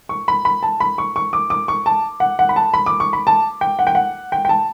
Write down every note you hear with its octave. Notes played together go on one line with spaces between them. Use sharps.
C#6
B5
B5
A5
B5
C#6
C#6
D6
D6
C#6
A5
F#5
F#5
B5
A5
B5
D6
C#6
B5
A5
G5
F#5
G5
F#5
G5
G5
A5